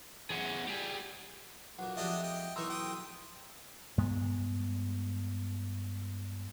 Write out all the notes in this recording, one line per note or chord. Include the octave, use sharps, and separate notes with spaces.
E2 C#4 G#4 F#5
G3 G4 G#4
B1 A#2 F#5
F2 G#3 D4 G4 D#5 E5
D#5 G5
B1 E3 D#4 A#4 C6 C#6 E6
G5 D#6
G2 G#3 B3